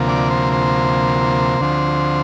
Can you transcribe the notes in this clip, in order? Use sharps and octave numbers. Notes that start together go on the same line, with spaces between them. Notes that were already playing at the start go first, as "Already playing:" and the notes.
Already playing: D2 C3 F3 A#3
D5
C5
C5
D2 D3 F3 C4